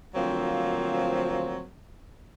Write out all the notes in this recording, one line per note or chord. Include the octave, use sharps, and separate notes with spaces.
D2 F3 F#3 A#3 C4